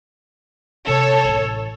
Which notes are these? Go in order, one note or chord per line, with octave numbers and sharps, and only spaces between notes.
C3 F3 A4 C#5
A1 E4